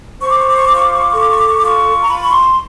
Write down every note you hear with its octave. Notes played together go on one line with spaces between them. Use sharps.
C5 C#6
D6
C#6
D6
C#6
F4 D6
C#6
D6
C#6
D6
A4 C#6
D6
C#6
D6
C#6
D6
F4
C#6
A#5
F4 B5
C#6
C6